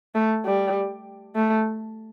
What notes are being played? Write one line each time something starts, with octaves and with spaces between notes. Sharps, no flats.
A3
G3
A3